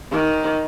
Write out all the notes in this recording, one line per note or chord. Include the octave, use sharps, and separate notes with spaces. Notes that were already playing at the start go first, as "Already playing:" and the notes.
D#3